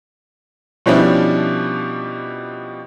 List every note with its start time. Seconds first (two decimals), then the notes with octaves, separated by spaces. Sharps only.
0.86 B2 F3 G3 C#4 D4 E4